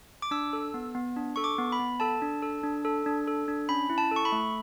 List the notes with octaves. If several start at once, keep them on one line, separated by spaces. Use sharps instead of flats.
D6
D4 E6
A4
B3
B3
D4
A4 C#6
D6
B3
B5
B3
A4 A5
D4
A4
D4
A4
D4
A4
D4
C#4 B5
E4
A5
A4 C#6
B5
A3